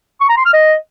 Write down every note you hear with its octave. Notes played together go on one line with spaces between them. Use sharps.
C#6
A#5
C6
F6
D#5